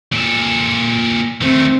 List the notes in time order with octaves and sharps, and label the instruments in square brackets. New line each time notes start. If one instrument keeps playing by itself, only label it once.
[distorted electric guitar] A#2 A4
[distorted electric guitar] D#3 A3 [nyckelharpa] C4